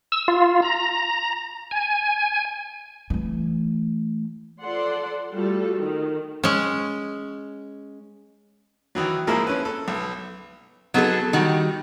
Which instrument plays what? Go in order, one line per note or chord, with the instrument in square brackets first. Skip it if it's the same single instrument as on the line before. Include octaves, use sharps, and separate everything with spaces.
[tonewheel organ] E6
F4
A#5
G#5
[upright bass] E3 A3
[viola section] F3 A4 D5 F#5 C6
G3 A3 F4 F#4 A4
D#3
[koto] G#3 C#4
[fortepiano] D#3 E3 F#3
A1 F3 G#3 A#3 E4 A#4
C#4 B4
A4
B1
[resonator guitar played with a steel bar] F#3 B3 D#4 G#4 A4
D#3 G3 D#4 F#4